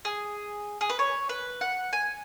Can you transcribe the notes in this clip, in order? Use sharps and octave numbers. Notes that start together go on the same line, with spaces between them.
G#4
G#4
B4
C#5
B4
F#5
G#5